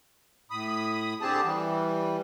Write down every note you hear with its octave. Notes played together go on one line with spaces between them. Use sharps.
A2 B5 D#6
D3 C4 G4 G#4 A5
E3 G3